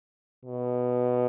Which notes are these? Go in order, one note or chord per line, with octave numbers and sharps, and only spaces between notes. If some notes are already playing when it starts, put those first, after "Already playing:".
B2